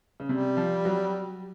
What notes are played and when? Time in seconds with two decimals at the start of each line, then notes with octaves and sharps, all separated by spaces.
0.20 C#3
0.29 C3 G3
0.57 F3
0.85 F#3